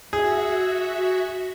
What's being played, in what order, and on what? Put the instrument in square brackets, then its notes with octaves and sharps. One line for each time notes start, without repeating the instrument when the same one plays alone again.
[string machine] F#4 E5 [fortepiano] G#4